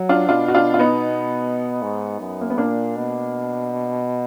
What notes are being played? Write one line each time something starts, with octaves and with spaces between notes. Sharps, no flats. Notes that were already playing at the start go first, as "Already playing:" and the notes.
Already playing: F#3
D4 F4
B2 D4 F4
F#4
D4 F4
F4
B3 D#4
G#2
F#2
A#3
B3
A#2 A#3 D4
B2